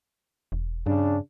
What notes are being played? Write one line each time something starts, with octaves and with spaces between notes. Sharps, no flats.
E1
G2 C#3 D4